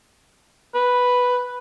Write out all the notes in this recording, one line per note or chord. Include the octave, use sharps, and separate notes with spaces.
B4